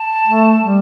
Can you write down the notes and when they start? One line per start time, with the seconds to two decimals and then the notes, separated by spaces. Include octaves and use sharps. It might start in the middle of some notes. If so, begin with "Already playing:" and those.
Already playing: A5
0.27 A3
0.62 G3